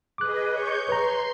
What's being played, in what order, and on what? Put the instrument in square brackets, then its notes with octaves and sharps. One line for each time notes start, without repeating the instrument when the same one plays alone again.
[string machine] G#4 B4 D#5 [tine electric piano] D6 F#6
[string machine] C#5 C#6 G6
[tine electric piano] B4 A#5 [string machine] C6